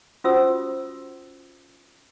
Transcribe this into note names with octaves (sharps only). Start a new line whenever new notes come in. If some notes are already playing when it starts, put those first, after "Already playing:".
C#4 F4 F#4 C5 D#6 E6